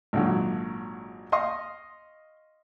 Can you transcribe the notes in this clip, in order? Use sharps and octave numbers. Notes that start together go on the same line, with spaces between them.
G#1 A#2 D3 F#3
D#5 F5 C6 C#6 D#6